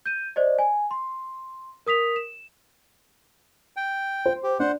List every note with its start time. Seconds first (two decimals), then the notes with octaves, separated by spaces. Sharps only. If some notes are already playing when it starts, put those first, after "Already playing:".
0.06 G6 D#7
0.36 C5 D5 D#5
0.59 G#5
0.91 C6
1.86 A#4 D#6 B6 F7
2.16 E7
3.77 G5
4.26 C5
4.43 G4
4.60 D4 C5 F#5